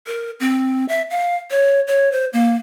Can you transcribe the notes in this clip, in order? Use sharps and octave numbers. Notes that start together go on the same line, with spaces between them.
A#4
C4
E5
F5
C#5
C#5
C5
A#3